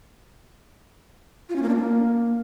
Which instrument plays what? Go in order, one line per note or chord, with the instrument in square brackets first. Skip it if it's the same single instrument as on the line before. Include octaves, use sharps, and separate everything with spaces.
[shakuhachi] F4
C#4
A#3
D4
A#3